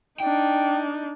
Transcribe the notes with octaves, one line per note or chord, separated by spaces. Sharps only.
D4 D#4 G5